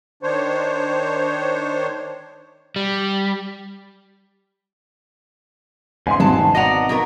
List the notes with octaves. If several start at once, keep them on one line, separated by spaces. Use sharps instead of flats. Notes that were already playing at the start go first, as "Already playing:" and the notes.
D#3 D4 C5 C#5
G3
E2 G#2 C#3 G#5 C6
G#1 F#3 A5
B2 D5 D#5 F#5 A#5
F#3 B3 A#4